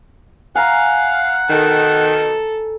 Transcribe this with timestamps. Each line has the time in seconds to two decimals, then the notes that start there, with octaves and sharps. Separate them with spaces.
0.55 F5 F#5 G#5 A#5
1.50 B2 D#3 A4